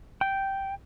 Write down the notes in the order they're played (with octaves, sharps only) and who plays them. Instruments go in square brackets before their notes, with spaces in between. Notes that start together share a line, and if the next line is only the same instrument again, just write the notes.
[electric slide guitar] G5